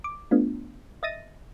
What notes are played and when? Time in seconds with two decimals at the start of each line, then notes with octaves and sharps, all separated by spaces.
0.04 D6
0.31 A3 B3 D4 F4
1.03 D#5 E5 A6 A#6 D#7